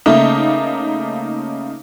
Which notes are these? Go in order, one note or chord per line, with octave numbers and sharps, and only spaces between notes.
C#3 A3 A#3 D#4